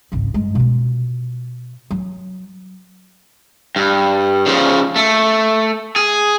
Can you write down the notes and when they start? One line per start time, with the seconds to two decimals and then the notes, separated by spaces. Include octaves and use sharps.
0.12 G#1 C#2
0.34 G2 G#3
0.55 B2 F4
1.91 F#3
3.76 G2
4.46 C#3 F3
4.96 A3
5.96 G#4